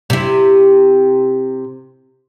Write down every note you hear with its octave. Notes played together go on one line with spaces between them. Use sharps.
C3 E4